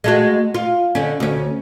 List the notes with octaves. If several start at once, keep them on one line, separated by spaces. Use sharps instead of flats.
G#3 A3 F#4
F4
D3 C#4
D2 C#4